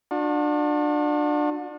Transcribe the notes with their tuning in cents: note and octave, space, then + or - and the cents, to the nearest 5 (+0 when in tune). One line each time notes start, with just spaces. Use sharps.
D4 +20 F#4 -40